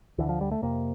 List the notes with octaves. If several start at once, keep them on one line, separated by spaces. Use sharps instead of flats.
D2 D3 E3
F3
G3
A3
F2 C3 A#3